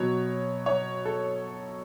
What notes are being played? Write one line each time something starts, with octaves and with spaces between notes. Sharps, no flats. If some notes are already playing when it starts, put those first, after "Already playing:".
Already playing: B2 F#3 C#5
C#5
A4